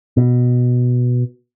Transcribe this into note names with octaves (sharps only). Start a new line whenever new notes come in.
B2